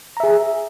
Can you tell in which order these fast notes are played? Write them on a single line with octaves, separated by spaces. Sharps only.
A#5 E5 G#4